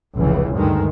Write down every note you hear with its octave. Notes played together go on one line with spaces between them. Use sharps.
F1 C#2 C#3 E3
D2 G2 D#3 G#3